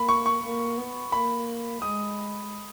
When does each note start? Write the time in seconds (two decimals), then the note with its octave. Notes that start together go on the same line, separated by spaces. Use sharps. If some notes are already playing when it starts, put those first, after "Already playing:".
Already playing: A#3 B5
0.09 C#6
0.26 C#6
0.43 A#3
0.77 B3
1.12 A#3 B5
1.82 G#3 D#6